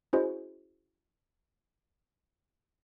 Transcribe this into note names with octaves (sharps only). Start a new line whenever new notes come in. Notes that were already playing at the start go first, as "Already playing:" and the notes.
C#4 E4 F#4 G#4 C5 D#5